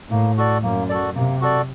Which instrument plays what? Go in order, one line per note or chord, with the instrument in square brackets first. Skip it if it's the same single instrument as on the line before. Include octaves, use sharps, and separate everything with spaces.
[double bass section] A2 [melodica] A#3
[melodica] F#4 A4 D5
[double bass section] F#2 [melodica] A#3
[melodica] F#4 A4 D5
[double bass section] C3 [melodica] A#3
[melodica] F#4 A4 D5